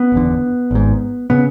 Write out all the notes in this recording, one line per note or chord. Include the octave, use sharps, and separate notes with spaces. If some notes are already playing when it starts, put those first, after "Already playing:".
Already playing: B3
F#1 E2 D3
G#1 G#2
C#3 B3